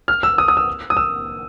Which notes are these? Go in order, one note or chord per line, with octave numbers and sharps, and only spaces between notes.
F6
E6
D#6
D#6
E6
D#6
E6